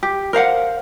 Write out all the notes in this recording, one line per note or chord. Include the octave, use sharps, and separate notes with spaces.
G4
A#4 C5 F5 F#5